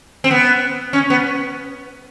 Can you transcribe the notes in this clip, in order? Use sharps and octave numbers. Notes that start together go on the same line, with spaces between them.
C4
B3
C#4
B3